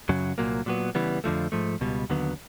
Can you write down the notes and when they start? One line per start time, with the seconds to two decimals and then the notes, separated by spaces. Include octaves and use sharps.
0.09 F#2 C#3 F#3
0.38 C2 A#2 F#3 A#3
0.66 A#2 F#3 B3
0.95 C#3 E3 G3 B3
1.24 F2 D3 F3 A3
1.52 G#2 F3 A3
1.81 C#2 B2 G3
2.10 D#2 D3 F#3 B3